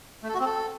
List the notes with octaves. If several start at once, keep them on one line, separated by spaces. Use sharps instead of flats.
A3
A4
F#4
C4
A4